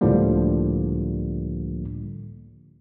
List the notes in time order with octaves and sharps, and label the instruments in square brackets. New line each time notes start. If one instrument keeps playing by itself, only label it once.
[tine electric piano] C#2 A2 D3 F3 G3 A#3